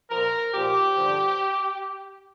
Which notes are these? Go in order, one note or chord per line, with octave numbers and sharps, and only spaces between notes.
A#2 F3 A#4
A#2 F3 G4
G2 D3 F3